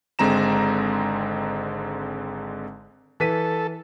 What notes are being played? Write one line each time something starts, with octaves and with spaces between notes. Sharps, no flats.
G#1 D3 G#3 C4 A#5 E7
E3 A4 B6 D#7